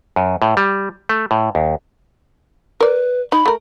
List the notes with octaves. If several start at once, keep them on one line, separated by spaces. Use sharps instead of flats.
F#2
A2
G3
A3
A2
D#2
A#4 B4 D5
D#4 B5
A3 A#4